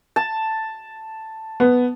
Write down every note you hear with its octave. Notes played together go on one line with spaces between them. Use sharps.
A5
B3